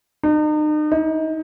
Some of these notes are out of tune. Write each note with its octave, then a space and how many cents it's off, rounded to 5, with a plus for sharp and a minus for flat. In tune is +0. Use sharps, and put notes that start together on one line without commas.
D#4 -40
D#4 +30